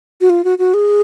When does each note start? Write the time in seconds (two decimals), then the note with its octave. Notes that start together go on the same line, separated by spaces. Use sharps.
0.21 F#4
0.30 F4
0.44 F#4
0.59 F#4
0.74 G#4